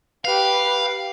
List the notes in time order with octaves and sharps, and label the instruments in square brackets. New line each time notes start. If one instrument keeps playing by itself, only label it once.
[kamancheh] G4 B4 [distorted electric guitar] F5